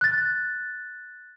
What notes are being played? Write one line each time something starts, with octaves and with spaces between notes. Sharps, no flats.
F#6 A6